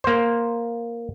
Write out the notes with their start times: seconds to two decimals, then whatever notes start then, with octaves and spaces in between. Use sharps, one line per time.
0.04 A#3 C5